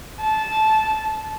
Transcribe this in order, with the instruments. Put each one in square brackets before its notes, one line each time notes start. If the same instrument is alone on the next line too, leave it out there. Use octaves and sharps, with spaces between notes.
[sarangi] A5